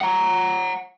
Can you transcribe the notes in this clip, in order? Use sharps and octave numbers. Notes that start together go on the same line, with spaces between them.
F#5 A#5